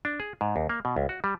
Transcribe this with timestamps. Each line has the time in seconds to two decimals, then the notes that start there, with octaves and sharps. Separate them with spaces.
0.05 D4
0.20 G#4
0.41 G#2
0.56 D#2
0.69 A#3
0.85 B2
0.96 C#2
1.09 F#4
1.24 G3